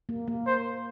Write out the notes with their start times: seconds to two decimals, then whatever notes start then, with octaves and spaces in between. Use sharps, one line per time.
0.09 A#3
0.28 A#3
0.47 C5